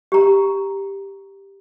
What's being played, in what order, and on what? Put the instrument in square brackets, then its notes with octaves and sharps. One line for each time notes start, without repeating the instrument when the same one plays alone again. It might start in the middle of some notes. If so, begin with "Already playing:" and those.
[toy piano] G4 A#5